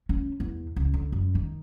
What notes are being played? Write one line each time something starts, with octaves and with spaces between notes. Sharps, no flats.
C#4
E2
C#2
D3
F#2
D#3